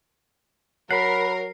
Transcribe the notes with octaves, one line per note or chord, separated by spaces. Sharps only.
F#3 A#4 F#5 B5 C7